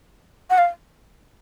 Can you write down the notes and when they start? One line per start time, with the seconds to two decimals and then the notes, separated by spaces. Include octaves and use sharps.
0.50 F#5
0.58 F5